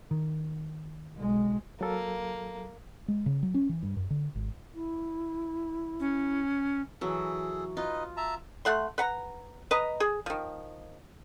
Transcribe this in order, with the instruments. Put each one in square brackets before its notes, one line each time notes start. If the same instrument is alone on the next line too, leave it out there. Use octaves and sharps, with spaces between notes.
[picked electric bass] D#3
[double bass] B1 G#3
[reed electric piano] F#3 A4 [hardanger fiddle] A#3
[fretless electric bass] G#3
C#3
F#3
C#4
E3
G2
F#2
D3
G#1
[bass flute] E4
[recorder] C#4
[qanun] E3 F#3 [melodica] G#4 A4
[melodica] D#4 B4 D#5 [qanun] F4
[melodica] E5 A5 A#5
[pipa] A3 F#5 C6
B4 F#5 A#5
B4 D#5 A#5
G#4
D#3 F3